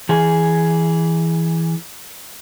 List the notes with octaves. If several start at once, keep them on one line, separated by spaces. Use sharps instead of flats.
E3 G#4